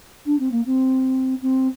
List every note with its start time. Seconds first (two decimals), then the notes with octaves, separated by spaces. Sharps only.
0.25 D4
0.39 C4
0.51 A#3
0.65 C4
1.42 C4